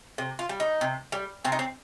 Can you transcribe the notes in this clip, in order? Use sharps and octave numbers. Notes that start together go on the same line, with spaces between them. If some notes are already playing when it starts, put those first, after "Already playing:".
C3
F4
G3
D#4
C3
G3
C3 C4
D#4
C4